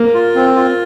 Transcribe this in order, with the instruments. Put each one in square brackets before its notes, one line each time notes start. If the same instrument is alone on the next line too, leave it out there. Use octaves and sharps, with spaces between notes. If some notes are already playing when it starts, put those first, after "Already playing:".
Already playing: [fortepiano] A#3
[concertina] F4
C4
F4